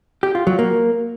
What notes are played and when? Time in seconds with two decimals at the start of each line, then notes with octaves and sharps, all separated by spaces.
0.23 G4
0.35 F4
0.47 F#3
0.59 A#3